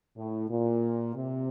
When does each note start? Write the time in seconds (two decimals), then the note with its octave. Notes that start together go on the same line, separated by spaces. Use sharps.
0.17 A2
0.49 A#2
1.15 C3